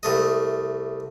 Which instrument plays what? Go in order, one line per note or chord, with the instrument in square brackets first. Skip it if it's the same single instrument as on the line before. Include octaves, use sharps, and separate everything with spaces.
[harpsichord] C2 A3 D#5